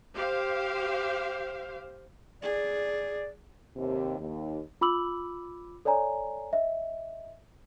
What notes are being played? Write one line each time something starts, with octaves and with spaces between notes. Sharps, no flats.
G4 C5 F5
G#4 D5
D#2 C3
D#2
F4 B5 D6 E6 F#7
A4 C#5 D5 G#5 A#5
D#5 E5